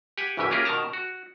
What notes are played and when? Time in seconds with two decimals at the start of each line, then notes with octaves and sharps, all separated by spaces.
0.18 G4 F#5 G#5
0.37 G#1 E2 C#3 E3 G4 G#5
0.51 A#3 C#4 F4 G4 G#4 A#4
0.65 B2 D#3 A#4 A5 A#5
0.93 F#4